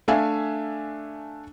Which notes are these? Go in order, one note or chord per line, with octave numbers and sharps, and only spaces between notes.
A3 D4 E5 F5 G#5